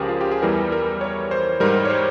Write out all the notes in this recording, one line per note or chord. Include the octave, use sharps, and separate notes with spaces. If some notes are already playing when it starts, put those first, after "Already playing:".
Already playing: C#2 C#3 F3 G4 G#4 A#4
F4
G4
G#4
E2 E3 G3 A#4
A#4
C#5
C5
G#2 G3 A#4
C#5
C5